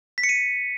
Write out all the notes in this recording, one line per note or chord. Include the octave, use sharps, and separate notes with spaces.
B6
C#7
D#7